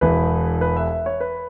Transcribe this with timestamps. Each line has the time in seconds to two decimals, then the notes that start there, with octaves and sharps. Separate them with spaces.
0.01 E1 E2 E3 B4
0.61 B4
0.77 E5
0.91 E5
1.06 C#5
1.20 B4